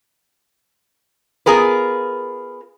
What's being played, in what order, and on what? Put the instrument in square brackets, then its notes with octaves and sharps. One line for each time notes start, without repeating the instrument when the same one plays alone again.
[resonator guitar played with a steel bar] B3 F4 G#4 A#4 B4